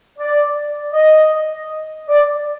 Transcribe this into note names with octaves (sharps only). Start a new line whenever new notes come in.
D5
D#5
D5